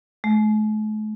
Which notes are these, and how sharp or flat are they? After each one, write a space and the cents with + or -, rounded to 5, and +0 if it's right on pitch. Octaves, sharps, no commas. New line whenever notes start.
A3 -45